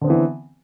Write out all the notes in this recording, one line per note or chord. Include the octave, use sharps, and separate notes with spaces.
D3 E3 B3 C4